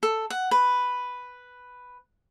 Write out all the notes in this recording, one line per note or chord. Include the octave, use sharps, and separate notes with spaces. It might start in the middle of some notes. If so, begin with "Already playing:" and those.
A4
F#5
B4